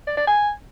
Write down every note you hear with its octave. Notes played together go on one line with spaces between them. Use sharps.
D5
D5
G#5